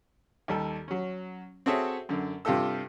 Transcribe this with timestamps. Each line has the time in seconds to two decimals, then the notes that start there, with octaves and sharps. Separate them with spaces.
0.48 D#2 G3 A4
0.88 F#3 C#4
1.66 C4 F#4 G#4 A4 C#5 E5
2.09 F#2 D3
2.45 G2 C3 F4 G4 A4 E6